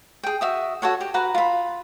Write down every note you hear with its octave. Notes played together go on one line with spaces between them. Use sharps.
G#4 G5
F#4 E5 D#6
F#4 A4 C#5 F#5
G4
F#4 B4 F#5 A#5
F4 B5